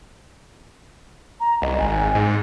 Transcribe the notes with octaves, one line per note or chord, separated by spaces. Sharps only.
A#5
C2 D#5
G#1 G#5
G#2